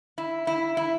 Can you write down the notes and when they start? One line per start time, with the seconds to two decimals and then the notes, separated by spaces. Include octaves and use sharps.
0.18 E4
0.47 E4
0.77 E4